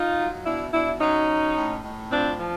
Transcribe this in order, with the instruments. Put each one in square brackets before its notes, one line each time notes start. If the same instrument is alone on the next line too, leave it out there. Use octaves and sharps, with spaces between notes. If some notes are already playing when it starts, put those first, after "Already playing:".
Already playing: [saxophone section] D#4 F4
F#3
B2 D4 E4
B2 D4 E4
F#3 C#4 D#4
F#3
A2
A2
F3 C4 D4
F3